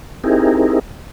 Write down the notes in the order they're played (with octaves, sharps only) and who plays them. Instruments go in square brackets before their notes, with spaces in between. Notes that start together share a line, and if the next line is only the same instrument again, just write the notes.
[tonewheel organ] C4 D#4 E4 G4 G#4 A#4